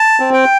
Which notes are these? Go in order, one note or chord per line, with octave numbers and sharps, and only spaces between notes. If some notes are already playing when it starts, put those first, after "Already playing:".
Already playing: A5
C4
G5